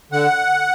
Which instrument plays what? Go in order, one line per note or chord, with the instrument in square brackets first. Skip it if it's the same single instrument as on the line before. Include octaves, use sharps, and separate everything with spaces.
[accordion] D3 F#5